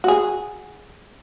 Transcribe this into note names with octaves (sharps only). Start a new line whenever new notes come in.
F#4 G#4